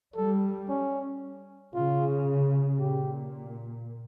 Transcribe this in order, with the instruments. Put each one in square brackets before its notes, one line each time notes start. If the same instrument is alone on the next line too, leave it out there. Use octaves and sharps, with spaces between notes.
[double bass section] G3 [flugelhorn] A4
[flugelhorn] C#4
[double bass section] C#3 [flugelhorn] F4
[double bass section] A#2 [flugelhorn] G4